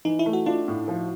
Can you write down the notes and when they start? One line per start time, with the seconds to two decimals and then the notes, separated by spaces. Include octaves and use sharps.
0.05 E3 D#4
0.19 E4
0.26 A3
0.33 F#4
0.46 D4 F4
0.68 A2
0.88 F3